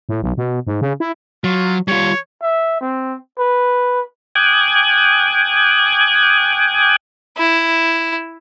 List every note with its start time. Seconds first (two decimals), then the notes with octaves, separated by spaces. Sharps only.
0.09 A2
0.22 B1
0.37 B2
0.67 G#2
0.81 C#3
1.00 E4
1.44 F#3 F4
1.88 G3 F4 C#5
2.42 E5
2.80 C4
3.38 B4
4.35 G5 G#5 D6 D#6 F#6 G#6
7.37 E4